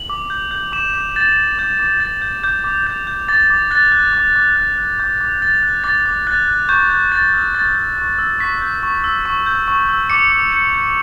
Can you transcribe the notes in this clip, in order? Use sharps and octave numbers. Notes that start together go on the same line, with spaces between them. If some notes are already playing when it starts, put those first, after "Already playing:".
Already playing: F#7
D6
G6
G6
D6 E7
D6
G6 A6
G6
D6 G6
D6
G6 A6
G6
D6 G6
D6
G6
G6
D6 A6
D6
F#6 A6
F#6
D6
D6
F#6
F#6
D6 G6
D6
F#6 A6
F#6
D6 A6
D6
F#6 A6
F#6
C#6 G6
G6
C#6 A6
E6
C#6 A6
G6
C#6
E6
C#6 B6
G6
C#6
E6
C#6
G6
C#6
E6
D6 C#7
D6
G6 C#7
G6